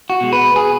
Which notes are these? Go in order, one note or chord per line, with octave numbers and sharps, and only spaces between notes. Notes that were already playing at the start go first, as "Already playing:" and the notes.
F#4
B2 G#3
B4
G#4